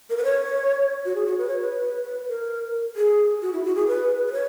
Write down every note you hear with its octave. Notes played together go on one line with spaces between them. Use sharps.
A#4
B4
C#5
F#4
G#4
F#4
B4
C#5
B4
B4
A#4
G#4
F#4
E4
F#4
G#4
B4
B4
C#5